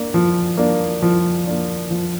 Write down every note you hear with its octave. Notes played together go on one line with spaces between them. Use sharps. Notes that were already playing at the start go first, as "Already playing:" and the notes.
Already playing: A#3 D4
F3
A#3 D4
F3
A#3 D4
F3